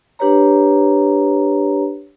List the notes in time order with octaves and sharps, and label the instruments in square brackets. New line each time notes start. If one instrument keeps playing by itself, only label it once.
[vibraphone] D4 G4 B4 C#5 A#5